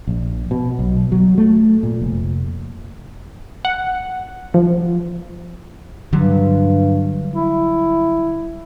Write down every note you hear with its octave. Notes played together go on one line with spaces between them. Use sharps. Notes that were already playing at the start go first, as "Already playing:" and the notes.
A#1
B2
B1
F#3
A3
A#2
F1
F#5
F3
G2 D3 F#3 G3
E4